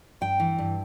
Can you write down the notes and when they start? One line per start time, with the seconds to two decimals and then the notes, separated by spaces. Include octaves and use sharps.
0.21 G2 G5
0.40 E3
0.58 G2